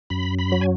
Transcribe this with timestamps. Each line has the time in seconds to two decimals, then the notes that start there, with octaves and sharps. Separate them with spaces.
0.10 F#2 B5
0.39 B5
0.52 F#3
0.61 G#5